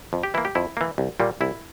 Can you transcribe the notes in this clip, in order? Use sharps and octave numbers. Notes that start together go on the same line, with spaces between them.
F2
G4
E3 A#3 E4
G4
F2 E4
E3 A#3
C2
A#2 G3 A#3
C2 E4